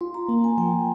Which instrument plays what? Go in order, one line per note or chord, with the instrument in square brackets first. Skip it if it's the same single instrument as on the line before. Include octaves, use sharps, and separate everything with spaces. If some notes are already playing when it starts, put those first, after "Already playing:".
[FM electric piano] F4 [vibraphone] C6
[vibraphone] A#5
[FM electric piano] A#3 [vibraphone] A#5
[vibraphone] G#5
[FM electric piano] F3 [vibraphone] G5